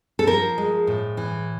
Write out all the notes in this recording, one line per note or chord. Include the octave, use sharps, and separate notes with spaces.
A4
F3 A#4
G#3
A2
E3